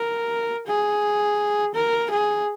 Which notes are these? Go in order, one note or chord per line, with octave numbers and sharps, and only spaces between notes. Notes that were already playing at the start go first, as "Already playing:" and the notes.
Already playing: A#4
G#4
A#4
G#4